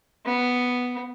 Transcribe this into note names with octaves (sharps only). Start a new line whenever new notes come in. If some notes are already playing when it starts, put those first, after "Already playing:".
B3